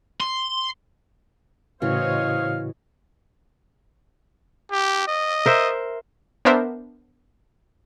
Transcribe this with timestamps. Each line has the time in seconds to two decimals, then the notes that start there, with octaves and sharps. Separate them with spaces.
0.21 C6
1.82 A2 C#3 E3 F#4 C5 C#5 D#5 F5
4.72 G4
5.08 D#5
5.46 A#4 C5 E5
6.45 B3 D4 A#4 C5 E5